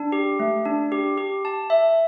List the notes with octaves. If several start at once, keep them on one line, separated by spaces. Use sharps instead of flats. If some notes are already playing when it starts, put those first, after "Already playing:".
Already playing: D4
G4
A3
D4
G4
G4
A5
E5